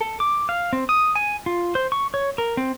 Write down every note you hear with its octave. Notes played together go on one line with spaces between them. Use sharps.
A4
D6
F5
C4
D#6
G#5
F4
C5
C#6
C#5
A#4
C4